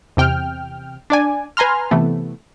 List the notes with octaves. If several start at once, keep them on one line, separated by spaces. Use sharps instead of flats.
E2 C3 G5 F6
D4 D5 G#5
B4 G#5 A#5 C6 F6
C3 E3 A3 B3